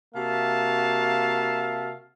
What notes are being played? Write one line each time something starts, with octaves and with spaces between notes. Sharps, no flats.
C3 A#3 F#4 E5 F5 A5